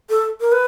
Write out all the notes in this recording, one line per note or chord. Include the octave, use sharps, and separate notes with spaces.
A4
A#4
B4